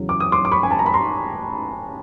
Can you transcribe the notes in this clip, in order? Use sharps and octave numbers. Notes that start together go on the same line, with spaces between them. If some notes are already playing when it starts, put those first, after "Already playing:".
Already playing: E2 C#3 F#3
D6
D#6
C6 D6
D6
B5 C#6
G#5
A5
A#5
B5
A#5 C6